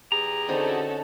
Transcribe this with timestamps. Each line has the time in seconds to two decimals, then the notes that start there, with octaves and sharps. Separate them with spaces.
0.12 E2 G4 G#4 A#5
0.48 D3 C4 C#4 D#4 F#4 A4